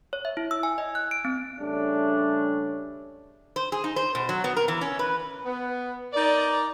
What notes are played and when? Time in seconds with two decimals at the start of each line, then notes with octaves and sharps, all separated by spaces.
0.13 C#5
0.25 E5
0.37 E4
0.51 E6
0.63 G#5
0.78 D#5
0.95 F#6
1.11 D7
1.25 C4
1.59 C#3 G3 A3 C#4 D4
3.56 C5
3.72 G#4
3.84 D#4
3.96 C5
4.15 B2
4.29 F#3
4.44 B3
4.57 A#4
4.68 E3
4.81 C#4
4.99 B4
5.45 B3
6.13 D#4 A#4 D5